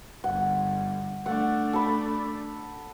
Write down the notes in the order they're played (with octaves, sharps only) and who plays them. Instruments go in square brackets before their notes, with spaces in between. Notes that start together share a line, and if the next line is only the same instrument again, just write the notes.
[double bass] G1 G2 [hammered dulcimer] F#5
[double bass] A3 D4 [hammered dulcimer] F#5
[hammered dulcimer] A4 B5